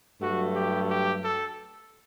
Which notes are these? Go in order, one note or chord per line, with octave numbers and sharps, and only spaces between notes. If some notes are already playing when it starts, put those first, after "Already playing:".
G2 F#3 A3 F#4
G4
G4
A4